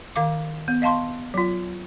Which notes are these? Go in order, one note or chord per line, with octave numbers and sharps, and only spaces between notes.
D#3 F5 D6
B3
D#5 F5 A5 C6 C#6
F#3 F4